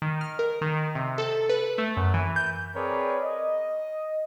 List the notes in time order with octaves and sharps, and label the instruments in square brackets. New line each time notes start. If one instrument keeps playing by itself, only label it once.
[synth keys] D#3
F6
A#4
D#3
C3
A4
B4
A3
F#2
E3
G6
[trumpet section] C4 G#4 A#4 B4 C#5 D5
D#5